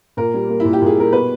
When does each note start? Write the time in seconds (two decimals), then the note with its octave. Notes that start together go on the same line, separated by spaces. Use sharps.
0.17 A#2 A#4
0.34 G3
0.49 A#3
0.60 A#2 E4
0.73 G4
0.82 A#2 G#4
0.96 G3 A#4
1.13 B2 B4